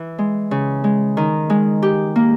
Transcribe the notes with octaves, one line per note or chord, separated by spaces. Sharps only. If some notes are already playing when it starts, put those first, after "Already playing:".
Already playing: E3 E4
G#3
C#3
G#3
D#3
G#3
G4
A#3